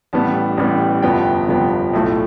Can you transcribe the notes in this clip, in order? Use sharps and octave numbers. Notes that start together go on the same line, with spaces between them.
A1 A2 G3 B3 A5
A1 A2 G3 B3
G1 F2 C3 F3 B3 G5
G1 F2 C3 F3 B3
B1 A2 F3 A3